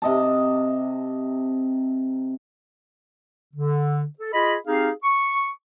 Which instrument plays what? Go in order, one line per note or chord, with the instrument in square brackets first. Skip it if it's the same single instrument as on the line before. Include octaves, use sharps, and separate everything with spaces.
[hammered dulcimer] C3 D#5 A5
[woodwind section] D3
A4
F4 G#4 D#5 B5
C4 D#4 G4 G#4 F5
C#6